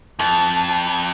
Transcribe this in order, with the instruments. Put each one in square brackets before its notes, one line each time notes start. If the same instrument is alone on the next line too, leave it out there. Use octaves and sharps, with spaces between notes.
[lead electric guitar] F2 [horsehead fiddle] A5